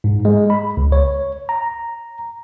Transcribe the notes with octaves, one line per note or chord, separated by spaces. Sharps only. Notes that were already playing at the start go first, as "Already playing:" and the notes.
G#2
G#3
B5
C#2
C#5
A#5